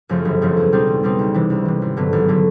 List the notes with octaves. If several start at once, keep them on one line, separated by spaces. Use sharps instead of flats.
F#2 C#3 F3 A3
G1
F#2 C#3 F3 A3
E2
B2 G3 C4 D#4
E2
B2 G3 C4 D#4
C#2
C3 E3
C#2
C3 E3
G#1
G2 D3 F#3 B3
G#1
D3 F#3 B3